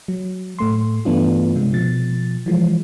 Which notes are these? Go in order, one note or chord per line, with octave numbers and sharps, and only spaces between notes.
F#3
A2 A3 C6
G2 E3 A3 B3 D4 F4
C3 G#3
B2 F3 A6
E3 F3 G#3